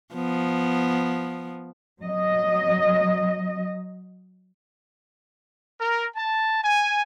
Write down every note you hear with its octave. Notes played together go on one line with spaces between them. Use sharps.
F3 B3
F#3 D#5
A#4
A5
G#5